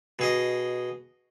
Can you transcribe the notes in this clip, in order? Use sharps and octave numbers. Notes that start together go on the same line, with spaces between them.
B2 G#4 D#5